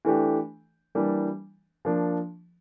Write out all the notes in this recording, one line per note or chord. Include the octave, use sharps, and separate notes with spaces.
E3 A3 D4 G4
E3 G3 A#3 D4
F3 A#3 D4